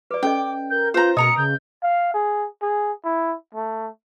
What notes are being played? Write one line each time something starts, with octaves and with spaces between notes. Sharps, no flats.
B4 D5 D6
C#4 A4 D#5 G5
A#4 G6
F4 B4 C5 A#5 G6
B2 A#4 D#5 A#5 D#6 C#7
C#3 G6
F5
G#4
G#4
E4
A3